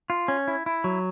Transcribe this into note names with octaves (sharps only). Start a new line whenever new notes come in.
F4
C#4
E4
E4
F#3